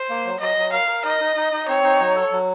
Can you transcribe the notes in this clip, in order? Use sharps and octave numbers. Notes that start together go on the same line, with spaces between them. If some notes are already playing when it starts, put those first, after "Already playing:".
Already playing: C5
A#3
F#3
F#3 D#5
F#3
A#4 F5
A#4
D#4 D#5
D#4
D#4
D#4
C4 C#5
D#4
F#3
A4
F#3